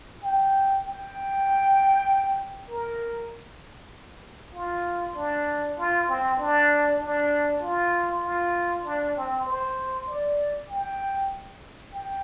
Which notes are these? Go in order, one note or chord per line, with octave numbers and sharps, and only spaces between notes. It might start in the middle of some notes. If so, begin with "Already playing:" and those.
G5
G5
A#4
F4
D4
F4
C4
D4
D4
F4
F4
D4
C4
C5
D5
G5
G5